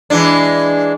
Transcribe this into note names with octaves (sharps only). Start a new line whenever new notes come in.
E3 G#3 D4